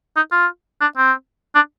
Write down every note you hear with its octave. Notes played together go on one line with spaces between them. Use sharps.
D#4
F4
D4
C4
D4